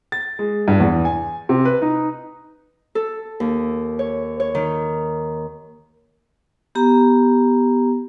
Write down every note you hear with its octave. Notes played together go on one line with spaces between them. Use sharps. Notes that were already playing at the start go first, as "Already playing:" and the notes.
A6
G#3
G2
E2
G#5
C3
B4
D#4
A4
D#2
C#5
C#5
D#3
B3 G4 A#5